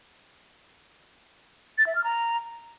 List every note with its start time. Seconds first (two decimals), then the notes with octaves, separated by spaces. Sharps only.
1.78 A6
1.87 E5
1.95 F6
2.04 A#5